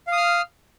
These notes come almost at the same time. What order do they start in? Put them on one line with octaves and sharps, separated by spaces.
F5 D#6 F6